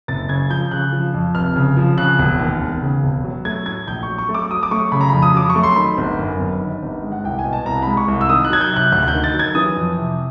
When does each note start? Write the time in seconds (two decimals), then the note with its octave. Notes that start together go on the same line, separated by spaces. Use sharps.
0.08 F#1 A6
0.29 C#3 G#6
0.50 F3 G6
0.71 C#3 F#6
0.93 F3
1.14 F2
1.35 F1 F6
1.56 C#3
1.77 F3
1.98 C#3 F#6
2.18 E1
2.40 D#2
2.61 E1
2.82 C#3
3.03 E1
3.24 F#3
3.45 A3 G#6
3.66 A2 G#6
3.87 A#1 G6
4.03 F#3 C#6
4.18 C#6
4.29 A3
4.34 D6
4.50 F#3 D#6
4.63 D6
4.71 A3 C#6
4.92 C#3 B5
5.01 A#5
5.09 F2 B5
5.22 D#6
5.35 F#3 D6
5.50 C#6
5.55 A3
5.63 C6
5.76 D#3 B5
5.97 G1
6.19 F#2
6.39 G1
6.61 D#3
6.82 G1
7.03 G#3
7.12 F#5
7.24 C2 G5
7.39 G#5
7.44 B2
7.53 A5
7.65 C2 A#5
7.82 B5
7.87 G#3
7.97 C#6
8.08 C2
8.21 E6
8.29 D#3 D#6
8.44 F#6
8.50 F#3 G#6
8.61 G6
8.71 C3
8.76 F#6
8.92 D2 F#6
9.02 F#6
9.08 G6
9.13 D#3
9.24 A6
9.34 F#3
9.39 G#6
9.55 E3 D#6
9.77 F2
9.97 C3